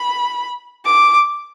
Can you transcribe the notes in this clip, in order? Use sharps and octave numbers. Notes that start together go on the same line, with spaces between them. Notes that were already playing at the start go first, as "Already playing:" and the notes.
Already playing: B5
D6